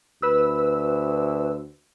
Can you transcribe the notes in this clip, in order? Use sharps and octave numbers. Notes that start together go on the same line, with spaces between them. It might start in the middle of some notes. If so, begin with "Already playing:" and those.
D2 B4 E6